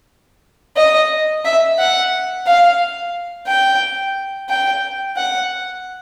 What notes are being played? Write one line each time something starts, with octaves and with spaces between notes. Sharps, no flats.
D#5
E5
F#5
F5
G5
G5
F#5